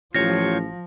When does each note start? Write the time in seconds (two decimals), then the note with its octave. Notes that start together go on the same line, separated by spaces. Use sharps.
0.14 A1 F3 F4 G4 C#5 A#6